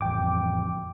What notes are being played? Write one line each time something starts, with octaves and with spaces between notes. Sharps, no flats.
A1 F2 G5 D6